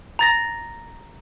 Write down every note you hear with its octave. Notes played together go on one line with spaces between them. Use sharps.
A#5 A6 A#6